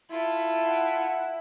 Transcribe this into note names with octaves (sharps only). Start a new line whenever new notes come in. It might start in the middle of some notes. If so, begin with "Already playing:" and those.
E4 F4 A4
F#5